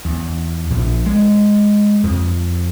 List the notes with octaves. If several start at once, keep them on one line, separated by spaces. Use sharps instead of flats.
E2
A#1
G#3
F2